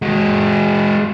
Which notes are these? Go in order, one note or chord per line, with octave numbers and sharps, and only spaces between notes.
G#3 F#4